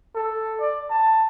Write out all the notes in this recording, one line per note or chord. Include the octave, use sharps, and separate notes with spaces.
A4
D5
A5